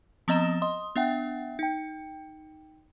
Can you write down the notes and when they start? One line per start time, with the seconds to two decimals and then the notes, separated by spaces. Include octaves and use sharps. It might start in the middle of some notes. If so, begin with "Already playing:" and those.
0.28 F3 B3 C4 D#5 A#5 E7
0.62 D#5 C6 D#6
0.96 B3 D4 E5 F#5 G5
1.59 D#4 G5